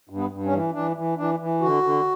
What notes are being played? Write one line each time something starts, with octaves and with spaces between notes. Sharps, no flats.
G2
B3
G2
C#4
E3
E3 D4
E3
E3 D4
E3
D3 F#4
D3